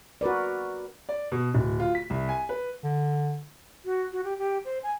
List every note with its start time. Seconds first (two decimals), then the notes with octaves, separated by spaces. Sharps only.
0.21 F#4 A#4 B4 D5
1.09 D5
1.32 B2
1.55 D1
1.80 F4
1.95 B6
2.10 C2
2.29 G#5
2.49 B4
2.84 D3
3.85 F#4
4.13 F#4
4.24 G4
4.39 G4
4.65 C5
4.83 G#5